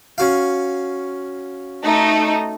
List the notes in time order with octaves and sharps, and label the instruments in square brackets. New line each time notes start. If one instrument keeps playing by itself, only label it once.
[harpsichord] C#4 F#4 F5
[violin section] A3 D#4